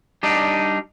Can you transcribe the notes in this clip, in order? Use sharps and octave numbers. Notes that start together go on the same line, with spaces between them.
G3 D4 D#4